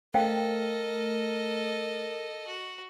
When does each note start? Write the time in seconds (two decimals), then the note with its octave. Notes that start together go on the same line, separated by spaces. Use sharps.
0.14 A3 A4 A#4 C5 D#5 F5 G5
2.47 F#4